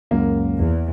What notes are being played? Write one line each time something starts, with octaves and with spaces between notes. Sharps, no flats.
C#2 F#2 A#3
E2